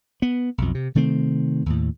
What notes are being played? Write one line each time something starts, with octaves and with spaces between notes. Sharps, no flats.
B3
B1 F2
C3
C3 D#3 A3 C4
D#2 A2